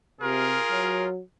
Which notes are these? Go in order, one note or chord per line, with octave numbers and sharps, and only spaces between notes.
C3 F4 G#4 A#4
F#3